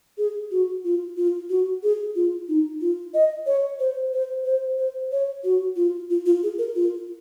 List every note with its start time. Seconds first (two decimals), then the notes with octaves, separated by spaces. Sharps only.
0.18 G#4
0.51 F#4
0.85 F4
1.17 F4
1.50 F#4
1.83 G#4
2.16 F4
2.48 D#4
2.81 F4
3.14 D#5
3.46 C#5
3.80 C5
4.13 C5
4.45 C5
4.78 C5
5.12 C#5
5.44 F#4
5.76 F4
6.10 F4
6.26 F4
6.43 G#4
6.58 A#4
6.75 F4